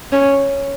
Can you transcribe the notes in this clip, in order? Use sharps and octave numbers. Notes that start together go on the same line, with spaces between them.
C#4